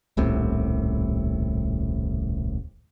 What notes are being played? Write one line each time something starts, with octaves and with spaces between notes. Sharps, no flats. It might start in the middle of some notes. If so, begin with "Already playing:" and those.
D#1 C2 A2 C3